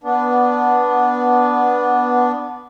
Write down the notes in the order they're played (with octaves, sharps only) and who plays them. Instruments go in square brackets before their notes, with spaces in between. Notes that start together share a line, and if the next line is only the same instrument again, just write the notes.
[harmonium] B3 D4